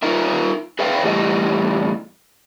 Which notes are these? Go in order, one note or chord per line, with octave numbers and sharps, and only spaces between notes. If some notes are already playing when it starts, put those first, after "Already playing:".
D#4 F4 A#4 E5
G#4 B4 E5 F5 G5
E2 A2 G3 D#5